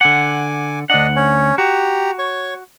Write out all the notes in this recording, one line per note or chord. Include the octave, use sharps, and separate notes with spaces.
D3 F#5 G#5 D6
D2 D4 D#5 F#5
C#4 C#5
F#4 G4 A#5
C#5 C#6